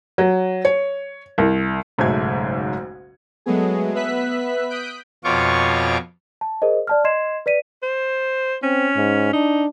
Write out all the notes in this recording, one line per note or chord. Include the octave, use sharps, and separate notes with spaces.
F#3
C#5
C2
F#1 B1 G#2 G#3 A3 G#6
F#3 G#3 A3 B3 G#4
B3 B4 E5 F#6 B6
D#6 F#6 G6 B6 D7
F2 B2 F4 C#5 C#6 D6
A5
G#4 A#4 C5 D#5
D5 A5 F6
D#5 C6 G#6 C7 E7
B4 D5 B6 D#7
C5
C4 C#4
G#2
D4 D#4